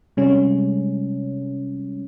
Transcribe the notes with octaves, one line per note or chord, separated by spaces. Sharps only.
C3 G3 G#3 C#4